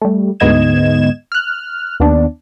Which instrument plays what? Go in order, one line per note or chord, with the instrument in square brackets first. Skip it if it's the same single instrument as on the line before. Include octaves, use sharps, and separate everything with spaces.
[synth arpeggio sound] G3 A3
D2 G#2 B3 D#5 G#6 E7
F6 F#6
D#2 B3 D4